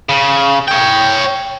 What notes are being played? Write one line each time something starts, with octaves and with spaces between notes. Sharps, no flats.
C#3
C#5 G5